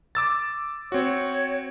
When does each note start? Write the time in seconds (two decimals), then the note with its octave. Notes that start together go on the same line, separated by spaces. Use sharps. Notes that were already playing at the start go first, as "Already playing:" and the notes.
0.15 D6 E6 A6
0.92 C4 F#4 C#5